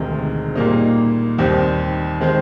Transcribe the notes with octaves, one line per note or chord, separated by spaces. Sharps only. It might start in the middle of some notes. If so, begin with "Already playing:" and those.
Already playing: E1 D2 C3 D#3 G#3
A#2 G3 A#3 D#4
D#2 D#3 G3 C4
D#3 G#3 C4